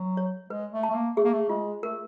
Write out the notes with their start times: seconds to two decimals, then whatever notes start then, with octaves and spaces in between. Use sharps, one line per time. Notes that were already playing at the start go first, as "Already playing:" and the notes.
Already playing: F#3
0.17 C#5
0.50 G#3 B4
0.72 A3
0.83 A5
0.91 A3
0.94 A#3
1.17 A3 G#4
1.24 A#3
1.33 A3
1.49 G#3 F4
1.83 A3 A#4